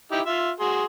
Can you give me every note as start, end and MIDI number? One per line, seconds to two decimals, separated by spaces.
0.12 0.21 63
0.12 0.21 64
0.12 0.21 67
0.26 0.51 65
0.26 0.51 76
0.60 0.84 66
0.60 0.84 68
0.60 0.84 84